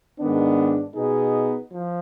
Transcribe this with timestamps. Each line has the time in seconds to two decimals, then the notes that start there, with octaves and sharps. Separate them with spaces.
0.19 G#2 D#3 B3 D4
0.95 B2 B3 D#4 G#4
1.71 F3